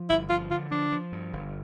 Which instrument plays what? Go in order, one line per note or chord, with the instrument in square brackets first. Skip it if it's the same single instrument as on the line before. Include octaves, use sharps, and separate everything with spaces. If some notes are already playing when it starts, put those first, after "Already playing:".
Already playing: [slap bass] F3
[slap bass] G1 [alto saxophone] E4
[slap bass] F3 [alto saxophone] F4
[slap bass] D3 [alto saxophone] F4
[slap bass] F3 [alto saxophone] D4
[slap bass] F3
G2
G1